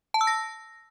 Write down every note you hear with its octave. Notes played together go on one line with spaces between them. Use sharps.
A5
E6
A#6